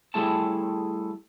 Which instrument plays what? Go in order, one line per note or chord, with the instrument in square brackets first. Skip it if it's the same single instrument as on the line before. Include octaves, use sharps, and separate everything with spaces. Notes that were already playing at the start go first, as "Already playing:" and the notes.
[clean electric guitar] G3 A3 E4 G#4 C#5 A5